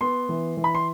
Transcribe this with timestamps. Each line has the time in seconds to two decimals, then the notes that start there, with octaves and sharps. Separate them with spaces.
0.01 B3 C6
0.29 E3
0.57 E3
0.64 B5
0.75 C6